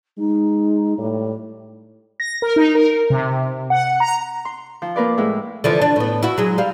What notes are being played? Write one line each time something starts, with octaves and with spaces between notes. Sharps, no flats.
G#3 D#4
A2 G3
A#6
A#4
D#4
A#4
C3
F#5
A#5
C6
F3
A#3 A#4 B4 D5
A2 G#3 E4
D3 E3 F3
D4
A2 B3
E4 F#4
F#3 G#3
G3 F5